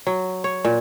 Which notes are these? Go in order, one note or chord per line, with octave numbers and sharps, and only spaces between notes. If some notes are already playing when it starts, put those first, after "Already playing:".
F#3
C#5
A#2